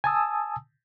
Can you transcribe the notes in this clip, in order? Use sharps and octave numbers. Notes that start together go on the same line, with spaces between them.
G#5 A5 D#6 E6